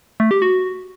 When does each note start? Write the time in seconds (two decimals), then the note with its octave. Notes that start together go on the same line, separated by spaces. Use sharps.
0.20 A3
0.31 G4
0.42 F#4